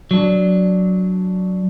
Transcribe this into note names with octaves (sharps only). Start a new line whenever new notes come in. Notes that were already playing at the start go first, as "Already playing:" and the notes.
F#3 D4